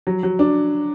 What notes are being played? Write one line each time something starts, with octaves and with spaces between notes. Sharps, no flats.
F#3
F#3
D4